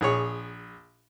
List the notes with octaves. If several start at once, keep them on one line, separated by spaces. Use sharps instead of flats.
A#1 G#4 C#5